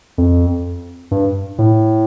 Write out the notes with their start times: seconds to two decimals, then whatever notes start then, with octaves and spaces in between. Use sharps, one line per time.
0.18 F2
1.11 G2
1.58 A2